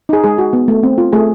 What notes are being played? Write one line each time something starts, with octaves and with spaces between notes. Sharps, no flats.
D#4 G#4
G#3 G#4
F#4
B3
A3
C4
F4
A3 G#4